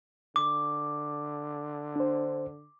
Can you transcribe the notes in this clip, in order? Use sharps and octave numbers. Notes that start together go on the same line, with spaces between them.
D3 D6
D4 C5